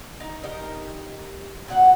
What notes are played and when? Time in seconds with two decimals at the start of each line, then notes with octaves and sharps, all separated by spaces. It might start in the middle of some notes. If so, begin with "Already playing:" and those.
0.20 D#4
0.43 D#4 G4 A#4
1.68 A#2 F#4 G4 F#5